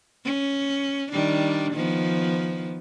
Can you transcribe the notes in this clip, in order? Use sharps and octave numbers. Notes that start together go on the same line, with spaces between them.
C#4
D#3 G3 D4
D#3 F3 B3